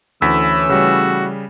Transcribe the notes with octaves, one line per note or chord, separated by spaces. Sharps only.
D2 E3 A3 C#4 B5 E6 B6
C#3 G3 F#4